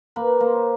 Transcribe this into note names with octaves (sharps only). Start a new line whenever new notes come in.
A#3 B4
A#3 C5